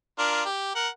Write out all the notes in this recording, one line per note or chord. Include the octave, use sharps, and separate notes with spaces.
D4 F4 A#4
G4
A#4 F#5